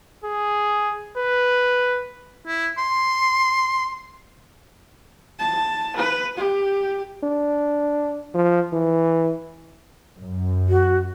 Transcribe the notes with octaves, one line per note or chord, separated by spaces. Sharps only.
G#4
B4
E4
C6
A5
B4
G4
D4
F3
E3
F#2
F#4